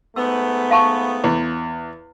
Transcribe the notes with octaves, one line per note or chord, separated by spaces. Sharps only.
G#2 A3 B3 E6
F5 A5 C#6
E2 C#5